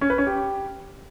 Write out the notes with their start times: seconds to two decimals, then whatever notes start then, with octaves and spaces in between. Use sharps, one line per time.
0.01 C#4
0.10 B4
0.18 C#4
0.27 G4